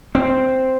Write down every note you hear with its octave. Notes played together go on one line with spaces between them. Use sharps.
C4